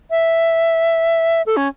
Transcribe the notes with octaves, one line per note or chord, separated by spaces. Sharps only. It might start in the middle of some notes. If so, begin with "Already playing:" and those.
E5
A4
C#4